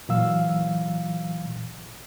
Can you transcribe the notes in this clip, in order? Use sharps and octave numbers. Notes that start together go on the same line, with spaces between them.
A#2 E3 F#3 F5 E6